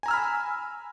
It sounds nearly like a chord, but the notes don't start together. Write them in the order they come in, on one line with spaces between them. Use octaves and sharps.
G#5 A#5 E6 F6 B5